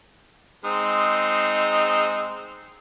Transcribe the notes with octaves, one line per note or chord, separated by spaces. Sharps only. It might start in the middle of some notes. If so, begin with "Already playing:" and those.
G#3 C4 D#4